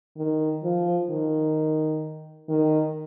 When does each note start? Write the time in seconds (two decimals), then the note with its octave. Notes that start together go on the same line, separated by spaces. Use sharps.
0.17 D#3
0.64 F3
1.10 D#3
2.49 D#3